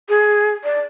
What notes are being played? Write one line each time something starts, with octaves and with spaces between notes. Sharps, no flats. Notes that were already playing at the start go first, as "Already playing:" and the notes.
G#4
D5